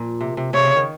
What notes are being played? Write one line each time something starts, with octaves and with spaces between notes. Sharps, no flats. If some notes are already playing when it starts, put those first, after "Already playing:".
Already playing: A#2 F3
C3
C3
C3 C#5
C#3
D#3